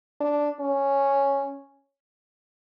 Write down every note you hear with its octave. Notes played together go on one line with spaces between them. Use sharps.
D4
C#4